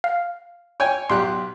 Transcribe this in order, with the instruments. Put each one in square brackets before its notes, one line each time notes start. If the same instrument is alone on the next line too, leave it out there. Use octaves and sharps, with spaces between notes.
[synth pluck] F5
[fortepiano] C#5 G5 G#5
[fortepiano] B1 G4 F#6 [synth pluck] C6